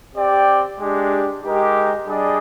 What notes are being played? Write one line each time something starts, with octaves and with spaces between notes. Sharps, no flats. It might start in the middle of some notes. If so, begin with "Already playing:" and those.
C4 G4 D5 G5
G#3 D4 G4
G#3 D#4 G4 A#4 D#5
G3 D4 G#4 D#5